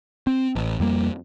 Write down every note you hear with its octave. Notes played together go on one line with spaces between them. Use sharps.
C4
A1
F2 G3 A#3